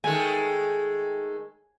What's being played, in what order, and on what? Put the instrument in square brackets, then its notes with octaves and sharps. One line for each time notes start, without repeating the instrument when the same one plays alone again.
[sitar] D#3 G#3 A3 [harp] G#5